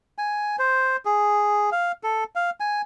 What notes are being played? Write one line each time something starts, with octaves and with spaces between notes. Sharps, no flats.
G#5
C5
G#4
F5
A4
F5
G#5